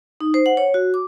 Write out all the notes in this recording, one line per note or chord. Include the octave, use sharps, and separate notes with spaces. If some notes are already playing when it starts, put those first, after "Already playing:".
D#4
C5
F#5
C#5
F#4
D6